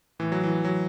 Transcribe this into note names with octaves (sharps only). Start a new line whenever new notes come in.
A2 E3
F#3
E3
F#3